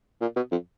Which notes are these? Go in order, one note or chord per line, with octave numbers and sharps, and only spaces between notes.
A#2
B2
F2